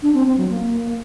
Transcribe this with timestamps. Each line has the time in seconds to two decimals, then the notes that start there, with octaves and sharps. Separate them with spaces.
0.03 D4
0.14 C4
0.26 C4
0.38 F#3
0.49 A#3